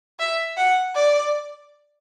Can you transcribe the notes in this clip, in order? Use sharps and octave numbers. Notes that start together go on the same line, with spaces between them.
E5
F#5
D5